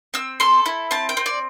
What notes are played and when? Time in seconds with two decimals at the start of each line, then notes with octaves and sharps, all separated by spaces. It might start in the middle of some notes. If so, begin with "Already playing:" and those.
0.14 C4 E6
0.40 A4 C6
0.66 E4
0.91 C4 A5
1.09 G5
1.17 C4
1.26 D5